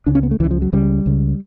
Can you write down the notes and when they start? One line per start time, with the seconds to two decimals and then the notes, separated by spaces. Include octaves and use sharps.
0.06 C#2 C#3 D4
0.15 C#4
0.23 B3
0.31 A3
0.40 C#2 C#3 E3
0.51 F3
0.62 F#3
0.72 C#2 C#3 G3
1.06 C#2 C#3